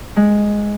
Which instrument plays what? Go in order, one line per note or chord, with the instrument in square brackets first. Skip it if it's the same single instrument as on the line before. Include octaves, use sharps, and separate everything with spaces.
[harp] G#3